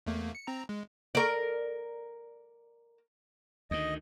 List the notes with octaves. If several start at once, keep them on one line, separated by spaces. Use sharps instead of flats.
E2 A3 A#3
C#7
C4 A#5
G#3
A#4 D5
D2 D#3 D#5